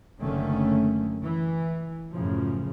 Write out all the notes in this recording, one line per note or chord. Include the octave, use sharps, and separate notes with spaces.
F#1 D3 D#3 A3 C#4
E3
F#2 A2 C#3 F3